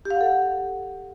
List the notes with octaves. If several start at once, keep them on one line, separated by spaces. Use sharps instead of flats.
G4
F5
F#5
A4
F#5